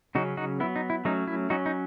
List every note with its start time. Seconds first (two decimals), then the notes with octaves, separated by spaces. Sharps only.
0.15 C#3 F#3 C#4 D#4 F#4
0.37 D#4 F#4
0.60 B3 E4
0.63 F#3
0.76 D#4
0.90 E4
1.05 F#3 A3 C#4 D#4
1.27 E4
1.50 F#3 C#4 D#4 F#4
1.66 D#4